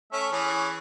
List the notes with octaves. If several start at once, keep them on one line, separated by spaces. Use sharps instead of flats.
A3 C#4 E5
E3 C#4 G#4